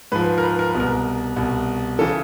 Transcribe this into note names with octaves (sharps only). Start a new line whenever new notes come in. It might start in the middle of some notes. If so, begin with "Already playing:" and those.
G#2 F3 B4
A#4
B4
A#4
B4
C2 B2
A#4
C2 B2
C#3 E3 A4